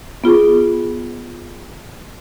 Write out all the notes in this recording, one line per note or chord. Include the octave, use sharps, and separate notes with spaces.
B3 F4 G#4